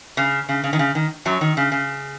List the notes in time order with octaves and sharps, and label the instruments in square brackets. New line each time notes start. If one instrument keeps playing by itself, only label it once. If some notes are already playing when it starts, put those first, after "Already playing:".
[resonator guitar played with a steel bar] C#3
C#3
C#3
D#3
C#3
D#3
F#2 F#3
D#3
C#3
C#3